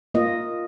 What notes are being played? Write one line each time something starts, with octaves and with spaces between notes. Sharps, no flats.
A#3 F4 D#5